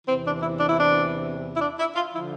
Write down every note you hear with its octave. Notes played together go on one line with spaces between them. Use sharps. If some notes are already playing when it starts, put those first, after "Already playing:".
E2 C3 E3 C4
D4
E4
D4
E4
D4
E4
D4
E4
F4
D3 F3 E4